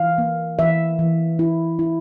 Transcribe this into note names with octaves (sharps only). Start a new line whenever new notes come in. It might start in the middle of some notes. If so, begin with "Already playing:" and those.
Already playing: E3 F5
A#3
E3 E5
E3
E4
E4